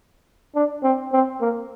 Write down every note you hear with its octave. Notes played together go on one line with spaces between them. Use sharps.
D4
C4
C4
A#3